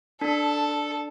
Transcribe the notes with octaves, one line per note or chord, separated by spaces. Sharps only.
D4 A4